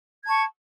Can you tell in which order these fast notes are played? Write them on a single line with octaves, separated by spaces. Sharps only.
G#6 A5 C#6